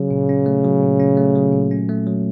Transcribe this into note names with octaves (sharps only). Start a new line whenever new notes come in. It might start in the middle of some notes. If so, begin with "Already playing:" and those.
Already playing: C#3 F#3
A#2
C#4
A3
F#3
A#2
C#4
A3
F#3
A#2
C#4
A3
F#3